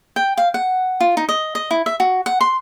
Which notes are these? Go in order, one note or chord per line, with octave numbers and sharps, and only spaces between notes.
G5
F5
F#5
F4
D#4
D#5
D#5
E4
E5
F#4
F#5
C6